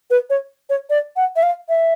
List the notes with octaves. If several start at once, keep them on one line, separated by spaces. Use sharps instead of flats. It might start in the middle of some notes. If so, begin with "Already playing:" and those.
B4
C#5
C#5
D5
F#5
E5
F5
E5